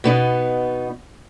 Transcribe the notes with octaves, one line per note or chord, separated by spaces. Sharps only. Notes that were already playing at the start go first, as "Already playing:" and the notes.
B2 B3 D#4